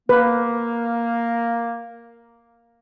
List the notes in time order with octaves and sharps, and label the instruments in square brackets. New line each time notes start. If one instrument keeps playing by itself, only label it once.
[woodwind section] A#3 [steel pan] B4